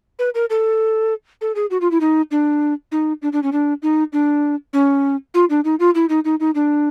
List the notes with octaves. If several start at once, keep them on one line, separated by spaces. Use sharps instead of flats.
B4
A#4
A4
A4
G#4
F#4
F4
E4
D#4
D4
D#4
D4
D4
C#4
D4
D#4
D4
C#4
F4
D4
D#4
F4
E4
D#4
D#4
D#4
D4